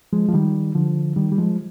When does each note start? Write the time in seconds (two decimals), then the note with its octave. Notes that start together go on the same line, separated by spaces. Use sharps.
0.13 F3 G#3
0.29 F3
0.34 D#3 G3
0.75 D3 F3
1.16 D#3 G3
1.32 G3
1.38 F3 G#3